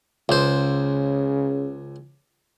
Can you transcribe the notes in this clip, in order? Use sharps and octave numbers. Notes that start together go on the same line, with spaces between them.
C#2 C#3 C5